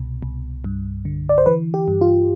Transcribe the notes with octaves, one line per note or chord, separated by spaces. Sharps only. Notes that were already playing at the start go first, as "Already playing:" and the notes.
Already playing: C2 B2
C2
G2
D3
D5
C5
E3 B4
G4
G2
F4